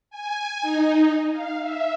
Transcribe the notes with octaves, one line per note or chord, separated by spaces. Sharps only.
G#5
D#4
F5
E5